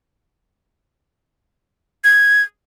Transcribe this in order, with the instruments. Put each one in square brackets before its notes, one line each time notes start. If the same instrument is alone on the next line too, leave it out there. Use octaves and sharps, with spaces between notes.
[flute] G#6